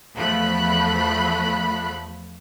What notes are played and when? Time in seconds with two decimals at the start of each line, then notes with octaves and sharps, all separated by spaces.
0.15 E2 F3 A3 B5 F#6